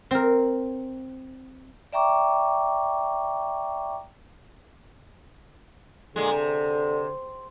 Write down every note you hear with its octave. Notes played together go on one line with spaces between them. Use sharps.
C4 A#4
D5 E5 G5 A#5 C#6 D6
A#2 D3 G#3
C3